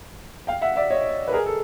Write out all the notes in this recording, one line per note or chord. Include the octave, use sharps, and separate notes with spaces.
F5 G5
E5 F#5
D5 E5
C#5 D#5
B4
G#4 A#4
A4